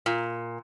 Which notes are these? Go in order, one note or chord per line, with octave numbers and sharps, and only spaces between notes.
A#2